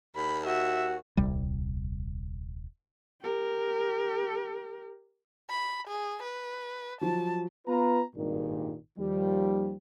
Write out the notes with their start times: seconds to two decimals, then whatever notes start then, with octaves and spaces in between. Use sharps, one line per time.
0.16 D#2 B5
0.46 F#4 E5
1.17 D#1 C2 G3
3.21 G4 A#4
5.50 B5
5.88 G#4
6.23 B4
7.01 F3 F#3 A5
7.67 B3 F4 B4 A#5
8.16 G#1 G2 A#2 D#3
8.98 D#2 F3 G3